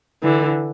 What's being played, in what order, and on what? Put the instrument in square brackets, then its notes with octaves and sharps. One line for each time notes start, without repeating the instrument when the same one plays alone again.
[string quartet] D3 E3